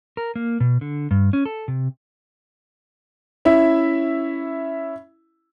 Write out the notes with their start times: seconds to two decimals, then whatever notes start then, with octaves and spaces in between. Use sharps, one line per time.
0.17 A#4
0.36 A#3
0.60 B2
0.81 D3
1.11 G2
1.33 C#4
1.46 A4
1.68 C3
3.45 C#4 E4 E5